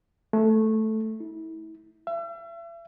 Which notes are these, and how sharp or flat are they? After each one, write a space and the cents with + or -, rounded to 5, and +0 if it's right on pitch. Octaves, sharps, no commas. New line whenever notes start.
A3 -5
E4 -35
E5 +40